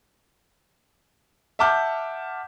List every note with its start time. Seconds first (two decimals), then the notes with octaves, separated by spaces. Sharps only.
1.59 E5 F#5 A5 D6 F6 G6